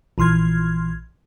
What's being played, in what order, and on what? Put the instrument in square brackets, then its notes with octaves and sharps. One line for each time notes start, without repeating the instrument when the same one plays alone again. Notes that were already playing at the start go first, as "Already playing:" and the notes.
[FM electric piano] A#1 E3 C6 F6 G#6